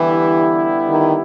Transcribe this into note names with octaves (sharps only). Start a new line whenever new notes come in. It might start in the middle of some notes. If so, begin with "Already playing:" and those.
Already playing: D3 E3 G3 B3 E4 G4
D#3